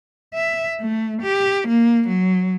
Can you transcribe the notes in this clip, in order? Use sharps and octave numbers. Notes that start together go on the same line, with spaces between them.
E5
A3
G4
A#3
F#3